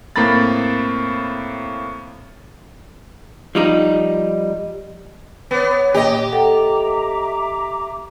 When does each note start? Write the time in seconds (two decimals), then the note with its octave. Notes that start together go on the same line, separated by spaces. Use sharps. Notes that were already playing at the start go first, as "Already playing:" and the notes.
0.16 A2 A#3 C4 A#5 B5 A6
3.55 F3 G3 D#4
5.51 B3 B4 C#5 D5 D6
5.94 A#2 A#3 G4 D#5
6.32 A4 E5 F#5 G5 A#5 D6